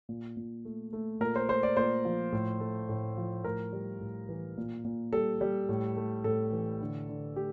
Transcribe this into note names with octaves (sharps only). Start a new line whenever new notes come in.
A#2
A#2
A3
A3
A#2 A#4
C5
A3 C5
D5
A#2 C5
F3
A2
A3
A2
F3
A2 A#4
G3
A2
E3
A#2
A#2
G3 A4
G3
A2
A3
A2 A4
E3
D3
D3
A3 G4